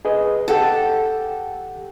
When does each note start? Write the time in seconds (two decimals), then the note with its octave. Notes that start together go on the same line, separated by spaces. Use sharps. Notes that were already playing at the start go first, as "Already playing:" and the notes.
0.05 G#4 B4 D#5
0.48 G4 A4 F#5 G5